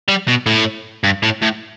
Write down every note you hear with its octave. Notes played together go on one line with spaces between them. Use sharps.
G3
B2
A2
G2
A2
A2